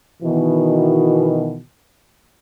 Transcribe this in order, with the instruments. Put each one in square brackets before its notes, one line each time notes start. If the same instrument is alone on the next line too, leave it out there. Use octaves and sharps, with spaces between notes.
[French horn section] B2 D#3 E3